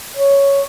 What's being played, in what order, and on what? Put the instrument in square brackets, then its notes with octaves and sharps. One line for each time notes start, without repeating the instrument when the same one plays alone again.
[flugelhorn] C#5